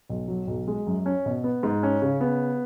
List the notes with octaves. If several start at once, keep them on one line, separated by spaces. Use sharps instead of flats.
B1
F#3
B1
G#3
F#2
C#4
B2
B3
G#2
C#4
C#3
B3